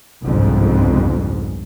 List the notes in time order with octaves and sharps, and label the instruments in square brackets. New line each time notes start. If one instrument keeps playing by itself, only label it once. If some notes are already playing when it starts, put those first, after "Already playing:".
[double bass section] G1 C2 F2 G#2 C#3